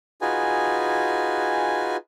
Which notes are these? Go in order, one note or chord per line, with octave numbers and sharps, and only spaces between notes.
D#4 F4 F#4 G#4 B4 G#5